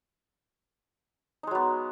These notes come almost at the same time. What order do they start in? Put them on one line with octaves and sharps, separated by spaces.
D#4 G#3 F#3 B3